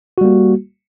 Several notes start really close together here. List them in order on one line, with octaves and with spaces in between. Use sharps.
F#4 G3 A#3